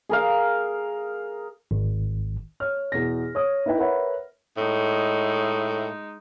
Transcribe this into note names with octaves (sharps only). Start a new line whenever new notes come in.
G#4 A#4 F5
G#1
C#5 F6
E2 B2 A#6
C#5 D#6
D#4 E4 B4 E5 G5
A#4 B4 C#5 E5 F#5 B5
A2 G#3 D#4